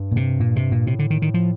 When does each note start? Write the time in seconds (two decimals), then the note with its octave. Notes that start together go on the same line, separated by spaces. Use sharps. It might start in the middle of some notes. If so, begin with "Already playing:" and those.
Already playing: G2
0.12 A#2
0.16 C3
0.40 A#2
0.56 C3
0.72 A#2
0.87 A2 C3
0.99 D3
1.10 D#3
1.22 D#3
1.34 F3